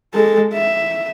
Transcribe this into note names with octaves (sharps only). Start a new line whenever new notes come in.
G#3 A4
E5